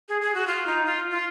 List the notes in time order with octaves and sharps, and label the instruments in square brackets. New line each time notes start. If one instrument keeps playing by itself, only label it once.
[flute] G#4
G#4
F#4
F4
D#4
F4
F4